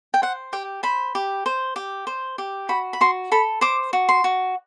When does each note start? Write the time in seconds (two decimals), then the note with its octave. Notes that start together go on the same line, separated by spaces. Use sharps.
0.14 G5
0.22 C5 F#5
0.53 G4 G5
0.83 C5 B5
1.15 G4
1.46 C5
1.76 G4
2.07 C5
2.38 G4
2.69 F#4 B5
2.93 B5
3.01 F#4 C6
3.32 A4 B5
3.61 C5 D6
3.93 F#4
4.09 C6
4.24 F#4